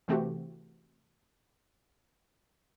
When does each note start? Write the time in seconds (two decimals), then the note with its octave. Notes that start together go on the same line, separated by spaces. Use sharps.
0.08 C3 E3 A3 C4 F#4 G4